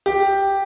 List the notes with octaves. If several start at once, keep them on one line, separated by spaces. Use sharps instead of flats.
G4